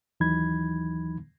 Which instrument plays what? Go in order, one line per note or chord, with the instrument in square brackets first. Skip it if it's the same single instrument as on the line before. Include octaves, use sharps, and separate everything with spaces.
[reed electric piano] D#2 E3 F#3 D#4 B5 G#6